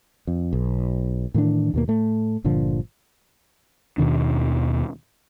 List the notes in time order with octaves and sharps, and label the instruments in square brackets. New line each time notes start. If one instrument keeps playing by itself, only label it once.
[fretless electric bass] F2
B1
A2 D#3 E3 D4
D#2 B2 A#3
A2 A3
G1 A#2 D3 F3
[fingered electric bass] D#2 B2 D#3 D4